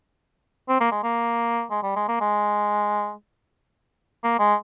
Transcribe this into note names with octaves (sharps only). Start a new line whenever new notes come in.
C4
A#3
G#3
A#3
G#3
G3
G#3
A#3
G#3
A#3
G#3